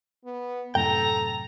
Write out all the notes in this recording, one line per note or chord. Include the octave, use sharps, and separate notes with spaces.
B3
F#2 A2 C3 A4 G5 A#5